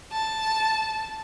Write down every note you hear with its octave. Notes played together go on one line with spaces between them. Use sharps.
A5